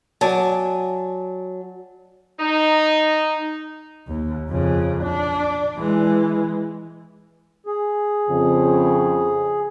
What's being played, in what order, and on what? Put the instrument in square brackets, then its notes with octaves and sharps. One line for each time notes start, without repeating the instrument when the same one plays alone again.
[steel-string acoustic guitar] F#3 [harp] D5 G#5 A5
[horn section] D#4
[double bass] D#2
F2 C#3
D4
E3 G#3
[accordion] G#4
[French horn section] F2 C#3